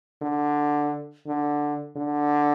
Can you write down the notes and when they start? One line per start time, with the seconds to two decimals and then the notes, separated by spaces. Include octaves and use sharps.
0.22 D3
1.27 D3
1.97 D3